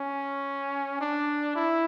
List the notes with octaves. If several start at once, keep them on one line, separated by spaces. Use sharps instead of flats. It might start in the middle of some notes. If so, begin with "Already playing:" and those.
Already playing: C#4
D4
E4